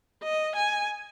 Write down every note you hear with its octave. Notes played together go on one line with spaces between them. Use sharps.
D#5
G#5